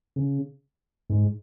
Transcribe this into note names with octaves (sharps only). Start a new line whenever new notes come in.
C#3
G#2